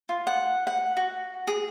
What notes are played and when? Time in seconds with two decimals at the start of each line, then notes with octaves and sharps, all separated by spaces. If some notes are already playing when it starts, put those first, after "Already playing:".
0.09 F4
0.27 F#5
0.67 F#5
0.97 F#4
1.47 G#4